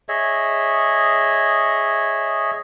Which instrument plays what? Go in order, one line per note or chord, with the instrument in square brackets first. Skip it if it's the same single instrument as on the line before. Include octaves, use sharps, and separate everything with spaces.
[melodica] G#4 C#5 D#5 E5